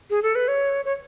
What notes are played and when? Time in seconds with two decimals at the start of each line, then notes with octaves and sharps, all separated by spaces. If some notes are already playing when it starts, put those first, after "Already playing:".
0.10 G#4
0.23 A4
0.35 B4
0.48 C#5
0.85 C#5